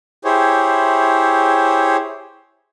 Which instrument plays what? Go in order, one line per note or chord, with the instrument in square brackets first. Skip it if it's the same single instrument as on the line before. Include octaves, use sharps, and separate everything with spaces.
[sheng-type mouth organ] E4 G4 G#4 C5 C#5